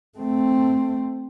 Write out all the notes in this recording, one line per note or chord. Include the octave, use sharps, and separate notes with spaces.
A3 C4